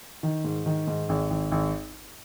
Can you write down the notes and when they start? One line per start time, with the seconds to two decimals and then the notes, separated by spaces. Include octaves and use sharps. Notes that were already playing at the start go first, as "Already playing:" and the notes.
0.23 D#3
0.44 G#2
0.66 D#3
0.87 G#2
1.09 G#1
1.30 G#1
1.52 G#1